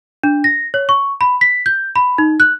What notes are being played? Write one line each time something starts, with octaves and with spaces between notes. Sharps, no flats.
D4
A#6
C#5
C#6
B5
B6
G6
B5
D#4
F#6